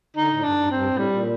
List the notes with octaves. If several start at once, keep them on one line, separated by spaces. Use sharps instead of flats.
D3 D#4
A2
G2 D4
G2
G2 C4
A2
G3
A#2